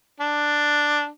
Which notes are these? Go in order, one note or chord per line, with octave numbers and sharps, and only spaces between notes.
D4